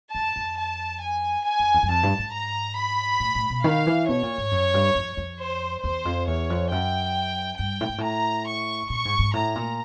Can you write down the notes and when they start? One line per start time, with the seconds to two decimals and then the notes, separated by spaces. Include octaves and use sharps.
0.14 F2 A5
0.36 F2
0.58 A5
1.02 G#5
1.45 G#5
1.59 F2
1.74 E2
1.83 F#2
1.89 F2 A5
2.03 G2
2.19 G#2
2.33 A#5
2.77 B5
3.20 A2
3.35 A2
3.50 B2
3.64 D#3 F5
3.87 E3
4.08 B2 C#5
4.23 A#2
4.38 G#2
4.51 F#2
4.74 G2
4.95 F2
5.17 F2
5.40 C5
5.83 E2 C5
6.05 F2
6.27 E2 C#5
6.50 F2
6.71 F#2 G5
7.59 G2 G5
7.81 A2
7.89 G#2
7.98 A2 A#5
8.46 C#6
8.90 A#2 C#6
9.05 G#2
9.19 G#2
9.34 A2 A#5
9.56 A#2